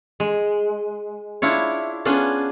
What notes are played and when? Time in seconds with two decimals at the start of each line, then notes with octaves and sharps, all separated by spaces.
0.20 G#3
1.42 D4 E4 F4 C#5
2.05 B3 C#4 D4 F4 G#4